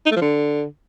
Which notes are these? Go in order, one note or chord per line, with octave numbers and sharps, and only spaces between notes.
D#4
A3
F3
D3